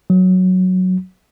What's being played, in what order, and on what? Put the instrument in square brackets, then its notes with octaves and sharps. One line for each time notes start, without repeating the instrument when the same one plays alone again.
[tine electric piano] F#3